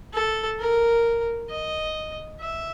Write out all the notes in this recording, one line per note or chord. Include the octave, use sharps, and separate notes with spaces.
A4
A#4
D#5
E5